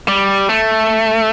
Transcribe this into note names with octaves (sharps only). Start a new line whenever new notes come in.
G3
A3